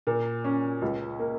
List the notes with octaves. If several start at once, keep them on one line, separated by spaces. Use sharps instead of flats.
A#2
C#4
C#2
A#3